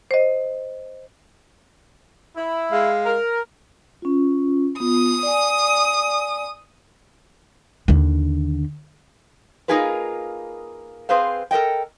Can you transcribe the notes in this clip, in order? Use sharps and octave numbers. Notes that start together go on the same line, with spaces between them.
C5 D#5
E4
G#3 F5
A#4
C#4 F4
B3 F4 D#6
D5 G#5
D#2 D3
A#3 D#4 F4 G#4 A#4 B4
C4 G#4 B4 C5 F5
A4 A#4 C5 D#5 G5